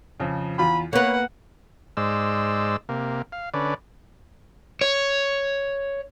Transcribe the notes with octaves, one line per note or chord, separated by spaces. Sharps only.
F2 C#3 F3
E2 F4 B5
A#3 B3 B4 C#5 F#5
G#2 G#3 C5 D5 E6
C3 A#3
F5
D3 C#4 B4 D5
C#5